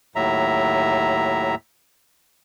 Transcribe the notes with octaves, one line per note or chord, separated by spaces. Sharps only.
D#2 A2 F#3 E5 A#5